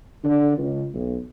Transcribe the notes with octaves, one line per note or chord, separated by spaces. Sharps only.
D3
C#2
B1